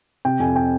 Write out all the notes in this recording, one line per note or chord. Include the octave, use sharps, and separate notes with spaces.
C3 G5
F2 G#5
G5